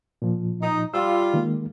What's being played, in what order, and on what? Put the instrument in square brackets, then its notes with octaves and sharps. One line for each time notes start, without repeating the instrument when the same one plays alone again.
[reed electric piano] A#2 F3
[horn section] D#4
[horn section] G3 F4 [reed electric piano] E6
[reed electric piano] D#3 G#3 A#3